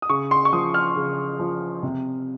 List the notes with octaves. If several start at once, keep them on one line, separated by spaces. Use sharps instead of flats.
D#6
C#3 C#6
C6
C#6
F3 D#6
F6
C#3
F3
C3